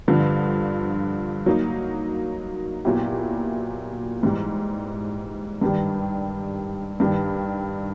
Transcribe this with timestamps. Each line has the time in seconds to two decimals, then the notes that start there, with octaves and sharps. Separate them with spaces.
0.08 G2 D3 F3
1.46 F#3 A#3 D#4
2.85 A#2 F#3 B3 E4 G4
4.23 G#2 E3 G3
5.61 G2 D#3 G3
7.00 G2 D#3 G3